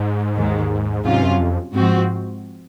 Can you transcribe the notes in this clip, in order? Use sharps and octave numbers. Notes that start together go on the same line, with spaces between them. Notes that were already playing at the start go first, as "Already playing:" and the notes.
Already playing: G#2
D#2 D#3 G#3
G#2 C3 F#3 C#4 F4
F#2
F2
G#2 F3 C4 F#4